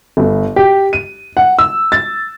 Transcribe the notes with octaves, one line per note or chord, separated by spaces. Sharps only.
G1
G4
D#7
F#5
E6
A6